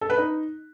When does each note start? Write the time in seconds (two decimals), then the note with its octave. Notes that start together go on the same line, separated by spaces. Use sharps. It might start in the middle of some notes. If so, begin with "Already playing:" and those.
0.01 A4
0.10 B4
0.18 D#4